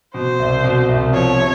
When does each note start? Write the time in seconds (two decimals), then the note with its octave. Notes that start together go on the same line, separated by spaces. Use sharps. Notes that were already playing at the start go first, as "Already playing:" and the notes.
0.14 B2 C5
0.39 C2
0.64 B2
0.89 C2
1.13 F3 C#5
1.39 C3